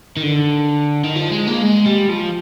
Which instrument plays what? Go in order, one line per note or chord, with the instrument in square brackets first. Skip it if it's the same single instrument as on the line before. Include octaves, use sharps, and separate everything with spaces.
[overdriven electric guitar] D#3
D3
D#3
F3
G#3
A#3
G#3
G3
F3